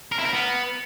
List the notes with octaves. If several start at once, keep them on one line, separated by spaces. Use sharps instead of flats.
A#4
E4
A#4
B3